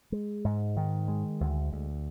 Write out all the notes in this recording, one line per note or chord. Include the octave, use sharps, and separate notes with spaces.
G#3
G#2
D#3
G#3
D2
D2